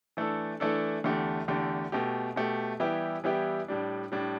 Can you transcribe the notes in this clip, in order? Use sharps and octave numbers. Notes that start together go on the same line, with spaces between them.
E3 A3 D4 A4
E3 A3 D4 A4
E2 D3 A3 G4
E2 D3 A3 G4
B2 A3 G4
B2 A3 G4
E3 G3 B3 E4 G4
E3 G3 B3 E4 G4
A2 G3 D4
A2 G3 D4